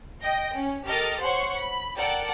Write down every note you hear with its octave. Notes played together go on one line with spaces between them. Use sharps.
D#5 G5 A#6
C#4
G4 A4 A#4 D#5 F6 A6
C5 C#5 F#5 C6 C#6
B5
A4 A#4 D5 F#5 G5 A5